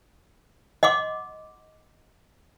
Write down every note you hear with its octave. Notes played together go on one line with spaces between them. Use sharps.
D#5 F#5 C6 D6